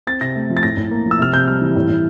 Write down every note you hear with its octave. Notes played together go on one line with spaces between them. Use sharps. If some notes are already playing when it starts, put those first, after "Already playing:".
C4 A6
C3 A#6
A3
F3
A6
A2 A#6
A2
A#3
F3
E6
C3 F6
C3 G6
G3 F6
E3
A2
A2